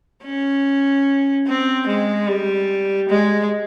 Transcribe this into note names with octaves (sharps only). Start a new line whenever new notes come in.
C#4
C4
G#3
G3
G#3